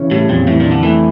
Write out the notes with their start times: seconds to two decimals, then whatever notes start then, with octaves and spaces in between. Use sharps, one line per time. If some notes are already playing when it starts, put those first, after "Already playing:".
Already playing: C#3 E3 C#4
0.11 A2 G3
0.29 F2 A#2
0.47 A2 E3
0.60 A#2
0.65 D4
0.71 D3
0.83 E3 A3